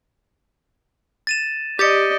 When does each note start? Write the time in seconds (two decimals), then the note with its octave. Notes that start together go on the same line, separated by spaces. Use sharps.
1.27 A6 D#7 E7
1.79 G4 D5 D#5 G6 A6 C#7